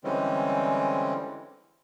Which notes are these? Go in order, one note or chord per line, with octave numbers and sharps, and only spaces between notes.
D3 E3 G3 G#3 C4 C#4